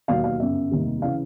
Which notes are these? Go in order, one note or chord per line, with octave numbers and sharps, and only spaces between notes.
E1 D#2 D#3 F#3 F5
F5
G1 F#2 C#3 E5
F1 D#2 D#3 G3
C#3 E3 F5